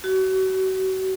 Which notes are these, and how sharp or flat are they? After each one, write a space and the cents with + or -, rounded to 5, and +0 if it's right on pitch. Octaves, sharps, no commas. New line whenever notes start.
F#4 +35